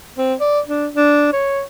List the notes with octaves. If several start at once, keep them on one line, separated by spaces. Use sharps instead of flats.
C4
D5
D4
D4
C#5